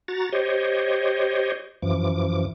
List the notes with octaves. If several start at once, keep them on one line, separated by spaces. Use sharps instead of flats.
F#4 A#5 A6
G4 C5 C#5 D#5
F#2 E3 F3 D6